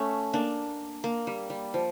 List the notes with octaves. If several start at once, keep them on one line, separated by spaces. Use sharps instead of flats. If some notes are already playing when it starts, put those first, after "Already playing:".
Already playing: A3 C#4
A#3 D4
A#3
G3
G3
F3